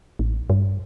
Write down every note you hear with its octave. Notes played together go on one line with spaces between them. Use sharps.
A1
G2